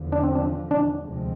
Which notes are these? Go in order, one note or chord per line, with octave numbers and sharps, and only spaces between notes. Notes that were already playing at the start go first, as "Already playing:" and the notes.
Already playing: E2 D3 F3
D4
C4
D4
D4
D2 C3 F3 G#3 C4